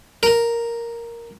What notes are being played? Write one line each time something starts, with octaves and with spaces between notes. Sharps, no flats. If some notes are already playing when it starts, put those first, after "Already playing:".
A#4